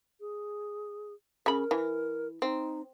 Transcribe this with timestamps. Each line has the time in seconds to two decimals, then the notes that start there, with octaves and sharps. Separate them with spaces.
0.20 G#4
1.46 C#3 A#4 B5
1.71 E3
2.42 C4 D#4